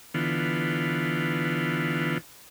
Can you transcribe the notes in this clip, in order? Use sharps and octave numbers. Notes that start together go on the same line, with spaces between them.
D3 E3 B3 F4